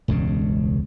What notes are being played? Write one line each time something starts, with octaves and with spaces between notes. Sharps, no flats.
E1 C#2 G2 C#3